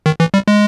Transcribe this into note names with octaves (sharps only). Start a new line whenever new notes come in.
D#3
E3
G3
G#3